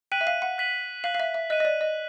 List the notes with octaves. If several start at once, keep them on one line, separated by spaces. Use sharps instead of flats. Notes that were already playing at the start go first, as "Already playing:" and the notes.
G5 F#6 B6 D#7 F#7
E5
F5
F#5
F#6 B6 D#7 F#7
F5 F#6 B6 D#7 F#7
F5
E5
E5
D#5 F#6 B6 D#7 F#7
D#5
D5
D#5